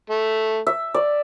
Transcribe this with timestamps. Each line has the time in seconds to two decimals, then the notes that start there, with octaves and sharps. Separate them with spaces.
0.10 A3
0.67 E5
0.94 D5